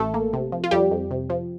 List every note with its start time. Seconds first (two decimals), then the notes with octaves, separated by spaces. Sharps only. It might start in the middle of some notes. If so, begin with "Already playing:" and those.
Already playing: A1 A3 A4
0.14 A#3
0.33 C3
0.52 F3
0.64 F4
0.71 F2 G3 G4
0.91 F2
1.11 C3
1.30 F3